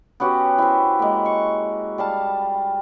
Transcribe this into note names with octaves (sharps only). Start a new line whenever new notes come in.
B3 C#4 F#4 G4
E4 C5
G#3 A#3
C#6
G3 F5 A5